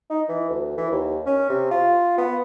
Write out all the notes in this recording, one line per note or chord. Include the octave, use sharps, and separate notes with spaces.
D#4
E3
D2
E3
D#2
C#4
C3
F4
B3